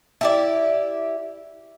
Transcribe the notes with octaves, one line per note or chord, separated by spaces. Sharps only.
E4 G4 D5